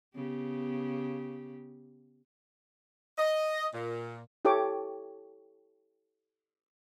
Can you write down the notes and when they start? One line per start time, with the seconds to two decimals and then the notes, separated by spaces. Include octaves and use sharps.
0.14 C#3 B3 G4
3.18 D#5
3.74 A#2
4.45 E4 G4 A4 C#5 D6